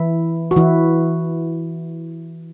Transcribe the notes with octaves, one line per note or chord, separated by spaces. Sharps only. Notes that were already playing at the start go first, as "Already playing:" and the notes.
Already playing: E3 E4
F#4
E3 E4